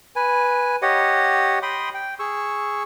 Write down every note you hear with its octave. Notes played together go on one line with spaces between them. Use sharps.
B4 G#5
G4 C#5 D#5 F#5
G5 B5 C6 D#6
G5
G#4 C#6 E6